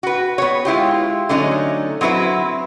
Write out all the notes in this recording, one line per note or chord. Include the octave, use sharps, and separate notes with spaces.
F#4 B4
B3 C#5
G#3 E4 F4 G4
D3 F#3 A3 C#4 D#4
F#3 C4 E4 B4 E5